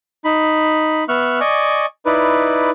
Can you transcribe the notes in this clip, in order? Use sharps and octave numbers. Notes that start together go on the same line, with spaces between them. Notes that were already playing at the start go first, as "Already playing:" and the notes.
D#4 B5
B3 E5 C#6 F6 F#6
D5 D#5 G#5 C#6
D#4 E4 B4 D5